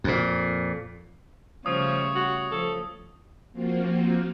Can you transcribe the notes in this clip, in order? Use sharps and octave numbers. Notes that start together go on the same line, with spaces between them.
F2 A#2
C#3 F3 G3 A3 C#5 D#6
F#4
F3 A4
F3 A#3 C4 F4 F#4